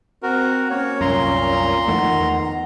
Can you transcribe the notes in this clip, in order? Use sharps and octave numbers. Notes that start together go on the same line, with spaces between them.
C4 F#4 A#4
A#3 C#4 C#5
C2 F#2 A#2 A#5 C6
F2 D#3 E3 A3 F#5
E2